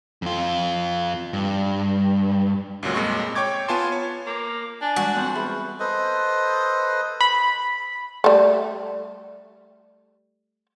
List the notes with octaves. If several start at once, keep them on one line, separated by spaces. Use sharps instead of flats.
F2 F4
G2
C#2 F#2 A#2 F#3
F2 A#2 G#3 C#6
C#5 G5 C#6 D6 G#6
B3 F4 G#5 A5 C6
C#5
A#3 D6
D4 G#5
E3 G3 G#3 F#4
F2 B3 C4
G#4 B4 E5 B5
A4 B4 C5 D#5
B5
G3 A3